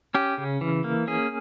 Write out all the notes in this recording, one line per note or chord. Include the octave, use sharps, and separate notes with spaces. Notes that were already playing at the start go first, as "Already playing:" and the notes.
C#4 G4
C#3
E3
A#3
C#4 G#4